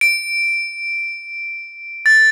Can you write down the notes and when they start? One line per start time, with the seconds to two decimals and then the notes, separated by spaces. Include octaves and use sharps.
0.01 D7
2.06 A6